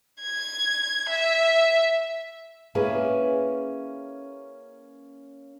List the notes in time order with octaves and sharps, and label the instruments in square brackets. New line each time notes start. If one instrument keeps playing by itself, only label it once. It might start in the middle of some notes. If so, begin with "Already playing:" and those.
[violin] G#6
E5
[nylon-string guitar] A#3 C#4 E4 G#4 B4